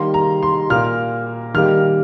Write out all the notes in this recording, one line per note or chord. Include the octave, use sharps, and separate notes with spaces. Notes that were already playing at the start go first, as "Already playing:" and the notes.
Already playing: D#3 G3 A#3 C6
A#5
C6
A#2 A#3 F6
D#3 G3 A#3 F6